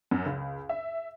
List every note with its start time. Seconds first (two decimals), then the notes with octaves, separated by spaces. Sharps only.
0.11 F#2
0.26 C#2
0.69 E5